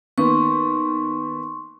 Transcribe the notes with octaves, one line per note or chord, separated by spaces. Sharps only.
D#3 A#3 B3 C6 C#6